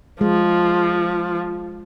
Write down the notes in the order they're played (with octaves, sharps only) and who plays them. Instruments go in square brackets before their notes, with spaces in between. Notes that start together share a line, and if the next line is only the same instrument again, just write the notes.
[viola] F3 [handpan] G#3